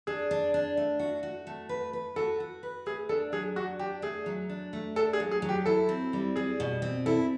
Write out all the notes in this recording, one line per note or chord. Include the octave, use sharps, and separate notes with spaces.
D4 G#4
D4
D4
A3
F#4
F#4
A3
B4
B4
F#4 A4
F#4
B4
A3 G#4
D4 A4
F#3 G#4
D4 F#4
D4 G4
A3 G#4
F#3
D4
A3
D4 A4
G#4
F#3
G#4
F#3
G4
E4 A4
C4
G3
G3 G#4
B2
C4
E4 A4